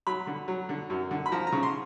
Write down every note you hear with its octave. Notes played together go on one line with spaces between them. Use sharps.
F#3 B5
D3
F#3
D3
F#2
D3
B5
F3 A#5
A#5
C#3
C6